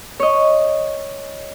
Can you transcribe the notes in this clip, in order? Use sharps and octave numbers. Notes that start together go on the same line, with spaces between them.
C#5 D#5